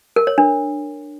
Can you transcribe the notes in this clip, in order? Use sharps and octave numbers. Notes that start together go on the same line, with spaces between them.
A#4
C#5
D4